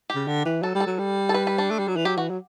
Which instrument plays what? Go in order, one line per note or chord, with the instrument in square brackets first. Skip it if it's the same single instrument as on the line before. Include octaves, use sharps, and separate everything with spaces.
[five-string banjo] G4
[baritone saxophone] C#3
D3
E3
[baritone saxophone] F#3 [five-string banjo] A4
[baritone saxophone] G3
[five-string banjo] A4
[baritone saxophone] F#3
G3
[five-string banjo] A4
B4
B4
D4
[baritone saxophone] A3
G3
F#3
E3
[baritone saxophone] F#3 [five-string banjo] G4
[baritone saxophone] E3 [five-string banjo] F#4
[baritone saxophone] F#3